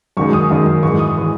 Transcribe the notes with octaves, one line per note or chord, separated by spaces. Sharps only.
F#2 D#3 G#3 C#6
D#6
F#2 D#3 G#3
G#2 E3 G#3 C#6
D#6
E3 G#3